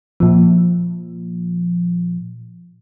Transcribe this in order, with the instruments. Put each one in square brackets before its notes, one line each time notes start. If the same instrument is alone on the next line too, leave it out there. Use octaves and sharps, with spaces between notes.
[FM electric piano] A#2 F3